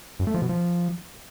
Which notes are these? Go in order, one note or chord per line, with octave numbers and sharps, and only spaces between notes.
F#2
A3
F3
B2
F3